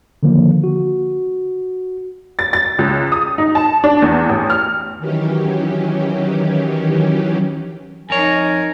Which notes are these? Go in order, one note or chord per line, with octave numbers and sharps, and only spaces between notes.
D3 D#3 F3 A#3
F#4
A6
A6
C#2
D#6
D#4
A5
D4
E2
A1
F6
D#3 E3 F#3 C#4 G4
F2 D#4 A#4 C#5 G#5